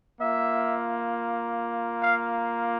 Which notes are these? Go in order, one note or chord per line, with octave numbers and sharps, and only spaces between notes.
A#3 F4 E5
F5